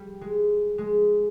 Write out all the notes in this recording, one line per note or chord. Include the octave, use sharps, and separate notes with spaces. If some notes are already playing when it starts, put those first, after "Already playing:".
Already playing: G3
G#3
G#3